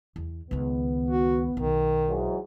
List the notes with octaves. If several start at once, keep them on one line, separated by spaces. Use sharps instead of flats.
E2
C#2 D#3 B3
F#4
B1 D#3
G#2 E3 F#3